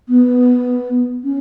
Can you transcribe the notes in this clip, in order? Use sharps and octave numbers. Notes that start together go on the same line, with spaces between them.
B3
C#4